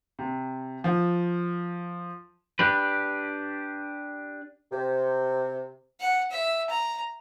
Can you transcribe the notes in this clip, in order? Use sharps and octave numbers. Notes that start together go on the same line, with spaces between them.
C3
F3
D4 G4 B4
C3
F#5
E5
A#5